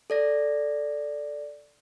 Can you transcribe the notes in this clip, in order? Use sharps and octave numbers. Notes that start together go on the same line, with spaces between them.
A4 D5 A#6